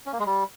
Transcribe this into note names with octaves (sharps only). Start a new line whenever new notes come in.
C#4
A#3
G#3
G3